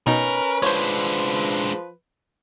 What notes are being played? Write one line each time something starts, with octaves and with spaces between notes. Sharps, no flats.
B2 C#4 D#4 A#4 B4
F3 G#3 D4 C5 C#5